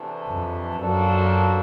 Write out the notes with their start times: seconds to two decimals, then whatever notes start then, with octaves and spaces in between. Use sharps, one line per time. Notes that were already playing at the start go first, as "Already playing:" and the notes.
Already playing: E2 C3 E3 A3 D4
0.28 F2
0.78 F#2 F3 A#3 D4 F#4 A4